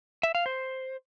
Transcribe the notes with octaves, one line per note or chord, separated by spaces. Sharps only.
E5
F5
C5